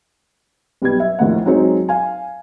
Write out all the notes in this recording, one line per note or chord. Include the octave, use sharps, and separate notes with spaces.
B1 G3 B3 B4 G#6
E5
A#1 D#2 A2 F#5
F#3 G#3 C4 D#4 C#5
F5 G#5